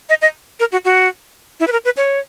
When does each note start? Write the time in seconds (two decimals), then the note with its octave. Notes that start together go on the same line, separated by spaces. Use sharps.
0.09 D#5
0.22 D#5
0.60 A#4
0.72 F#4
0.85 F#4
1.60 E4
1.67 B4
1.72 A#4
1.85 B4
1.97 C#5